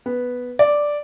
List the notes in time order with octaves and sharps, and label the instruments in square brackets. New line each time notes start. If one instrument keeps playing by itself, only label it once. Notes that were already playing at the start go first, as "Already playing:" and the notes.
[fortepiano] B3
D5